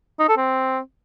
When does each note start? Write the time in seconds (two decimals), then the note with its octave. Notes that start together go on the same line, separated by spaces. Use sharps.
0.19 D#4
0.28 A4
0.37 C4